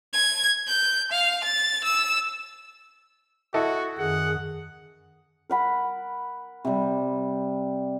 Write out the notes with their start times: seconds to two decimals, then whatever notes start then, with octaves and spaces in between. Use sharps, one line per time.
0.13 G#6
0.67 G6
1.11 F5
1.44 A6
1.84 E6
3.54 E4 F#4 A4 D#5
3.98 F#2 D#3 G#4 F#5
5.50 A#4 F#5 B5
6.65 C3 G3